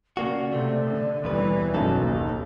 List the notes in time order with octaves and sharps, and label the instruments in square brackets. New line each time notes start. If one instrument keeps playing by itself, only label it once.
[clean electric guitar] C#3 A#3 F#4 [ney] D5
[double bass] C3 [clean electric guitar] A3
[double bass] D3
[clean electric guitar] D#2 B2 B4 [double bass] E3 G3
[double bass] F#1 F#2 [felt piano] B1 [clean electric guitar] D#4 A4
[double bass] D#2